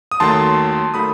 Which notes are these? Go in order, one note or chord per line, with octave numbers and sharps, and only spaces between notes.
D#6
D#2 D#3 F#3 A3 A5 C6
D#3 F#3 A3 B5 D#6